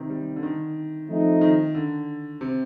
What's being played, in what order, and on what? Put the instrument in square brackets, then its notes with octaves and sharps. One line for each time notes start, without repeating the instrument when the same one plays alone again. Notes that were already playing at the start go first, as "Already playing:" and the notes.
Already playing: [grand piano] C3 D#3
G3
D3
D#3
[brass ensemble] F3 A3 C4 D#4
[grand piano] D#3
D3
C3